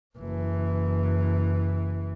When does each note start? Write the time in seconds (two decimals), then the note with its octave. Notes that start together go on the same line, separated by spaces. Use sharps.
0.17 F#1 E3